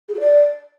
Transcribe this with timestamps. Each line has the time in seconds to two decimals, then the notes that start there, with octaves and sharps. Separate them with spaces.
0.08 G#4
0.14 F#4
0.19 D5